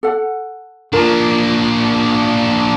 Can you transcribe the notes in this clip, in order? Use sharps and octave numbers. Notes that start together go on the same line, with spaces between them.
A4 F#5
A#3 D4 F4 A#4 A#5